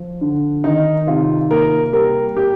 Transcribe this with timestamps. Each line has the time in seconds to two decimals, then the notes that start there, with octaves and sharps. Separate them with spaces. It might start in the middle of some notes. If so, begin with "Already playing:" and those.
Already playing: F3
0.21 D3
0.64 D#3 D#4
1.07 C3 F4
1.51 A#3 A#4
1.93 G3 A#4
2.37 G3 G4